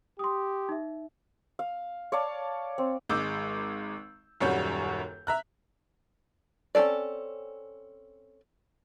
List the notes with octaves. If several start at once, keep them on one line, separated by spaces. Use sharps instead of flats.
G4 C6 D#6
D#4 E5
F5
C#5 D5 F5 A5
C4
G#1 G#3 D6 E6 G6
D#1 F#2 G3 C#5 F#5 G6
E5 A#5 F#6
C4 C#4 F4 A4 D5